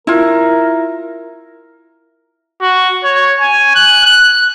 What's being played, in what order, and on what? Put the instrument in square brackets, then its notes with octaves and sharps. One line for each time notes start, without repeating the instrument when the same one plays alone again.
[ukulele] E4 F4 [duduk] A#4
[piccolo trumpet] F#4
C#5
G#5
F#6
F#6